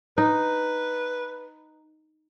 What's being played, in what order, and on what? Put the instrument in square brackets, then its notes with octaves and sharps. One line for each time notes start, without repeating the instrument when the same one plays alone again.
[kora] D#4 [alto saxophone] B4